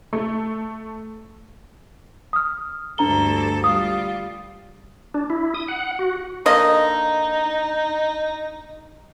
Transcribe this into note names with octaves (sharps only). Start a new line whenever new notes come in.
A3
D#6 F6
D2 G2 D4 A4 A#5 G7
G3 F4 D#6
D4
E4
D#6
F#5
F#4
D3 A#3 D#4 D#5